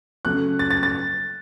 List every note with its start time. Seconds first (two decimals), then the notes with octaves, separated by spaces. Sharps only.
0.25 C#3 F#3 A3 F#6
0.59 A6
0.71 A6
0.83 A6